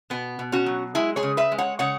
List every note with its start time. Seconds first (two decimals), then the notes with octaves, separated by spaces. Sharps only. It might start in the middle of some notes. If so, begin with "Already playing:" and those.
0.10 B2 B3
0.39 B2
0.52 C#4 F#4
0.66 F#3
0.95 G#3 E4 G#4
1.16 G#4 C#5
1.23 C#3
1.37 B4 E5
1.52 G#3
1.58 C#5 F#5
1.79 C#3 C#5 F#5